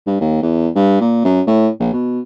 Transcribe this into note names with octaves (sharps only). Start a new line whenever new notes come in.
G2
D#2
E2
G2
A#2
F#2
A2
A#1
B2